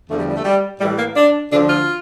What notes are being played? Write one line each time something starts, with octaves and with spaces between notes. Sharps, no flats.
E2 D3 F3 A3
G3
G3
A3
G3
A2 E3 G3
A#3
D4
D2 D3 F3 D4
F4